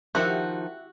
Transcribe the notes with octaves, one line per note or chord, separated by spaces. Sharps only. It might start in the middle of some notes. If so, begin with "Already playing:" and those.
D#3 F3 E4 F#4 G4 E5 F#5